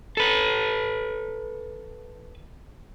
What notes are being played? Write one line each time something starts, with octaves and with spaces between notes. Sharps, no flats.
A4 B4